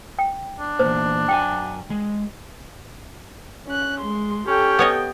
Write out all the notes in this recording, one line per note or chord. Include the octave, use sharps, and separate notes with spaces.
G5
D4
E2 A#2 C5
F#2 F#4 G5 G#5
G#3
C#4 F#6
G#3 C6
C#4 G4 A4 G5
B3 C#5 D#5